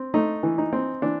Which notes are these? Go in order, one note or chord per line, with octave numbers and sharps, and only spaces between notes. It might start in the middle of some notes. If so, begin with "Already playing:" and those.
Already playing: C4
A3 D#4
E3
D#4
C4
E3 D4